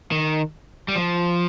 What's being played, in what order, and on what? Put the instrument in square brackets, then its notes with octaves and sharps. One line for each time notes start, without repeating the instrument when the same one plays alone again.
[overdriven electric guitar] D#3
G3
F3